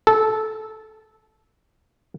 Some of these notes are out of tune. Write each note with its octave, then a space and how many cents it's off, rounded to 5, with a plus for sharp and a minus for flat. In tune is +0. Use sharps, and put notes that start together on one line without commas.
A4 -15